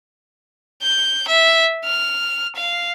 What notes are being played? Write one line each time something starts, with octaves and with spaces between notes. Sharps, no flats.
G6
E5
F6
F5